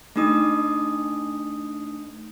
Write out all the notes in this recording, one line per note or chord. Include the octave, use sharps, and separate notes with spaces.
A3 D4 D#4 D#6